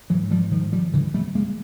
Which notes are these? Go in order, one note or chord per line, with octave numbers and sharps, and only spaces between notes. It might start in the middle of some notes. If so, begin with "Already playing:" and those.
G#2 E3 F#3
F3 G3
D#3 F3
F3 G3
D3 E3
G3 A3
G#3 A#3